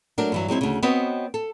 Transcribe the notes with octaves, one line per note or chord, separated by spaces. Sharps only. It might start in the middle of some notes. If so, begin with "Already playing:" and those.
F#3 A3 D4 A#4
G2 E3 F#3
F#3 G#3 C4 E4
D2 C#3
B3 C4 F#4 B4 C#5 D#5
A4